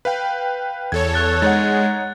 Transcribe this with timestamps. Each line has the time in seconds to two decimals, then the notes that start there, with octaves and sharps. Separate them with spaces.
0.05 B4 F5 G5
0.92 E2 A4 C#5 G#6
1.14 F#6 A6
1.42 G#3 D#4 C#5 F#5 A6